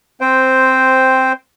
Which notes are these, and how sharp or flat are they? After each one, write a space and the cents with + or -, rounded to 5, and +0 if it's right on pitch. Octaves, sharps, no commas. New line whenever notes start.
C4 +0 C5 -5 G5 +0